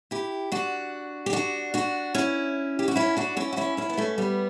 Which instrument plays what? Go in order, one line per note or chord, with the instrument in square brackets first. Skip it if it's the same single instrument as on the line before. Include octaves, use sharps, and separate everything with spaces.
[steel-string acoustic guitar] E4 G4
D4 F#4
G4
D4 F#4
D4 F#4
C#4 E4
G4
F#4
C#4 E4
D4 F#4
C#4 E4
F#4
C#4 E4
C#4 E4
B3
A3 C#4
G3 B3